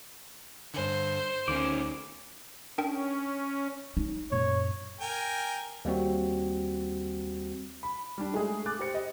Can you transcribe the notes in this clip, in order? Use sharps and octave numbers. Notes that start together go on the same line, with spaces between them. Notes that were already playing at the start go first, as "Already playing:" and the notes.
G2 D3 C5
D2 D#3 C#4 D6
C#4 D4 A#4 G5
D#4
F#2 A#2 C#5
A#4 G5 G#5
D#2 G3 C4 F#4
B5
G3 D4
G#3 A3 G#4
D6 F#6 A6
G4 C5 C#7
D#5